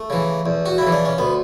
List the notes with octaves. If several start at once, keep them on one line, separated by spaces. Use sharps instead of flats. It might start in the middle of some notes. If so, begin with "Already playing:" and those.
Already playing: A3
C#3 E3
E2
F#4
C#3 E4
E3
D4
C#4
D2 B3